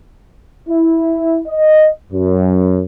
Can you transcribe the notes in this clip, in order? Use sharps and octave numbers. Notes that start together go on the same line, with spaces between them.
E4
D#5
F#2